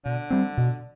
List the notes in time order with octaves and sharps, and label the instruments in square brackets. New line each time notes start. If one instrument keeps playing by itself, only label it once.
[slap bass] B2 [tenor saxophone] D3
[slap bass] G3 C4
B2